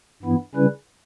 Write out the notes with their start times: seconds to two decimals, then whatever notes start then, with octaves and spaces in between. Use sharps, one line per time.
0.22 G2 E3 B3 E4
0.55 C#3 G3 C#4 E4 B4